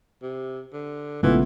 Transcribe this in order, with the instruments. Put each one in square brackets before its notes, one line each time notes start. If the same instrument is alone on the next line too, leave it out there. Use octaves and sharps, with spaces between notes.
[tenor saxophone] C3
D3
[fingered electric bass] A#1 C#3 G#3 [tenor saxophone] E3 [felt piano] A3 B3 F4